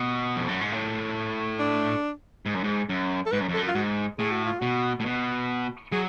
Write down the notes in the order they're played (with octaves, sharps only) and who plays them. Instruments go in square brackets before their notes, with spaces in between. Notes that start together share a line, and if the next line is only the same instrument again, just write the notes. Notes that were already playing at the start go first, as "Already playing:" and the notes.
Already playing: [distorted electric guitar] B2
F2
F#2
G#2
A2
[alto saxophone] D4
[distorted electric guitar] G#2
F#2
G#2
F#2
[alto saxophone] A4
[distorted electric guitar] G#2 [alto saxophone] B4
[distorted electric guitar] F#2
F2
[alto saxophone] A4
[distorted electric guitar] F#2
[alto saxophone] F4
[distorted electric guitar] G#2 [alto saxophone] F#4
[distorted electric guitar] A2 [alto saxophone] G#4
[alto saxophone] F#4
F4
[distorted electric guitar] B2 [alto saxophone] F#4
[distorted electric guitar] A2
B2
[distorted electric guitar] F#3 [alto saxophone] G#4